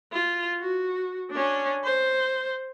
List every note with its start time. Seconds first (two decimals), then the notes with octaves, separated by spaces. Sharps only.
0.13 F4
0.60 F#4
1.31 C#4 D4
1.84 C5